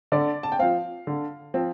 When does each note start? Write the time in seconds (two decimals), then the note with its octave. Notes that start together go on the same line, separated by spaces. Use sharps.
0.12 D3 D5
0.43 A5
0.52 G5
0.59 F3 C4 F5
1.07 D3
1.54 F3 C4